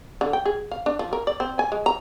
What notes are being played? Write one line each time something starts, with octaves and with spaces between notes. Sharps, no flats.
D3
G5
G#4
F5
D4
F3
A#4
D5
C4
G#5
G#3
A#5